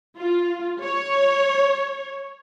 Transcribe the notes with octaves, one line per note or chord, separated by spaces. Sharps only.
F4
C#5